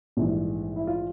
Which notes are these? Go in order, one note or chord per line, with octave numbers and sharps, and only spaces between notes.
A#1 G#2 E3 G3
E4
F4